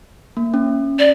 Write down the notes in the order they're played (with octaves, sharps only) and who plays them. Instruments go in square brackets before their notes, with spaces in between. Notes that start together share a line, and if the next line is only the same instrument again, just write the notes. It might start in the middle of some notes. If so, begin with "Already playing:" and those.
[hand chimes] A#3
C#4
[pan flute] D5